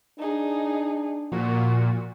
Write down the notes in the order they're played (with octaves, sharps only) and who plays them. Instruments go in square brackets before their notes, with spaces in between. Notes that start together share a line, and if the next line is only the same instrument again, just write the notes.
[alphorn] D4 [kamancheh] D#4 G#4
[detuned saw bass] A#2 [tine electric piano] F3 [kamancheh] F#4